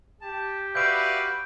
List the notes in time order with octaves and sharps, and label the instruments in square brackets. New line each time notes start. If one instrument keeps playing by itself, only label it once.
[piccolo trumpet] G4 [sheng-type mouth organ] A5
[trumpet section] F#4 B4 [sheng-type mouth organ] D5 E5 F5 [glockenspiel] G6 D7